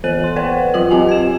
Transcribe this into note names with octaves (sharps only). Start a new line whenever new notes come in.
E3 B3 A4 C5 D#7 F#7
C6
B4 C5 D5 F#5 G5
F#3 F4 B4 D#6 F#7
C4 G4 D#5 G#5
G#6 E7